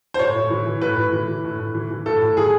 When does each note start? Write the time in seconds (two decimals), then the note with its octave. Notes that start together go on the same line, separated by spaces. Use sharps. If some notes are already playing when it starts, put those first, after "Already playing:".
0.14 C5
0.19 A2 C#5
0.36 A2
0.50 E3
0.66 E3
0.81 A2 B4
0.97 A2
1.13 E3
1.28 E3
1.44 A2
1.59 A2
1.74 E3
1.90 E3
2.06 A2 A4
2.22 A2
2.37 E3 G#4